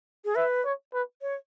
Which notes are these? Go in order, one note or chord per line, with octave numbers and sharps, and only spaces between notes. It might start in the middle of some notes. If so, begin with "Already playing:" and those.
G#4
B4 E5
C#5
B4
C#5